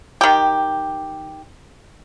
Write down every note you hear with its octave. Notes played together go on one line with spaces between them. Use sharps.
D#3 G4